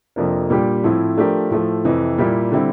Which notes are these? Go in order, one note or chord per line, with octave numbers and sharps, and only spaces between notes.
F2 C3 F3 A#3 D4
A#2 G3 D4 G4
A2 F3 C4 E4
F3 A3 D4 G4 A#4
A2 F3 A3
F2 C3 E3
A#2 G3 A#3 E4 G4
D3 G3 C4 E4